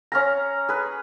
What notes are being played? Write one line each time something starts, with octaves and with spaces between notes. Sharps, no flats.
C#4 F5 A#5
G#4 B4